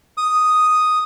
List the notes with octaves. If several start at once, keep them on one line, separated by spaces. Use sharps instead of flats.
D#6